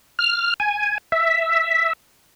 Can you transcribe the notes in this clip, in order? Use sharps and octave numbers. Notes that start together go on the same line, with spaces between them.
F6
G#5
E5